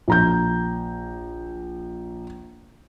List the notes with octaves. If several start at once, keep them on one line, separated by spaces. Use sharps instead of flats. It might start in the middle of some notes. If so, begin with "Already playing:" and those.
A#1 A#5 G6